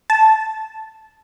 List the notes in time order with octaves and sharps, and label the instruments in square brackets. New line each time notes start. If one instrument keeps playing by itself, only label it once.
[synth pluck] A5